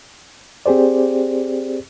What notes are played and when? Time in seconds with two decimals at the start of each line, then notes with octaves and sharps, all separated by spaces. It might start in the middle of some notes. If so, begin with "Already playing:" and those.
0.66 C4 G4 G#4 C5 D5